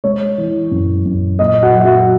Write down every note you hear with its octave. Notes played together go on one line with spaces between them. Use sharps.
G#3 C#5
E3
F#2
F#2
A#2 D#5
F#4 F#5
F#3
E5
F#4 F#5